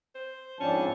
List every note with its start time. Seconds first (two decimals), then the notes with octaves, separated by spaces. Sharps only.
0.15 C5
0.60 F2 G#2 C#4 D4 A5